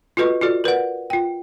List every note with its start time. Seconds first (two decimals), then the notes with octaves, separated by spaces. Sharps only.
0.17 F4 F#4 A4 B4 D#5 C#6
0.41 F4 F#4 A4 D5
0.64 A#4 B4 D5 F#5
1.10 F4 G5